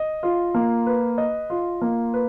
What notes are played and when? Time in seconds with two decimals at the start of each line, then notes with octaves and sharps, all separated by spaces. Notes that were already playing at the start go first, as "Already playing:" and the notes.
Already playing: D#5
0.23 F4
0.54 A#3
0.86 B4
1.18 D#5
1.50 F4
1.82 A#3
2.14 B4